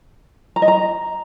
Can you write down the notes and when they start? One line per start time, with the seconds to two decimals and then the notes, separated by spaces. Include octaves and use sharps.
0.56 A#5
0.62 D#5
0.68 A#5